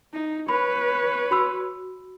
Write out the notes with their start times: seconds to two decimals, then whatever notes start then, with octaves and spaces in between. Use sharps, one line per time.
0.13 D#4
0.49 B4 C#5 B5
1.31 F#4 B5 E6